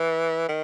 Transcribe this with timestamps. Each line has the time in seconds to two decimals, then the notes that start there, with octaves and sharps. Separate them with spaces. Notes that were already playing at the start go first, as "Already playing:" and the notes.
Already playing: E3
0.49 D#3